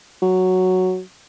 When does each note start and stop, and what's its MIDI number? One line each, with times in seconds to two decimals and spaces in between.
0.22 1.00 54